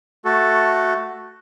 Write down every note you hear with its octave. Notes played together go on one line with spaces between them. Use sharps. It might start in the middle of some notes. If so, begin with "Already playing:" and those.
A3 F#4 A4